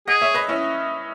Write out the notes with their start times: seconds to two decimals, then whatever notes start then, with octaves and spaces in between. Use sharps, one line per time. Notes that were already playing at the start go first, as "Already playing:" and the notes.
0.08 G#4 D#5 F#5
0.21 C#5 E5
0.34 B4 D#5
0.48 C#4 E4